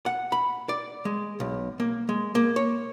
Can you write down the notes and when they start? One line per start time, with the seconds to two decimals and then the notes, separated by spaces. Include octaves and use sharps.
0.06 F#5
0.32 B5
0.69 D5
1.05 G#3
1.40 B1
1.80 A#3
2.09 G#3
2.35 A#3
2.56 C#5